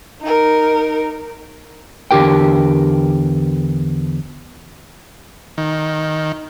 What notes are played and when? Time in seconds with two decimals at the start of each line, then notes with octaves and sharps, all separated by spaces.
0.22 D#4 A#4
2.11 E2 D3 G4 A#4 G5
5.58 D#3